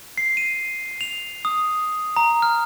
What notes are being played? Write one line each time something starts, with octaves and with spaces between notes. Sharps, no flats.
C7
D#7
F7
D#6
A#5
F6